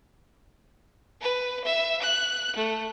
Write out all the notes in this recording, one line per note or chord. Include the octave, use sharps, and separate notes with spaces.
B4
E5
F#6
A3